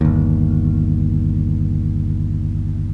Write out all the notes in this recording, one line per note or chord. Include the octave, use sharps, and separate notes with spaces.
G1 D#2